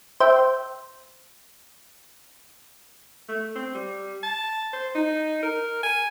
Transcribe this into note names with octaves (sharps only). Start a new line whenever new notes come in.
C5 E5 G5
A3
C4
G3
A5
C5
D#4
A#4
G#5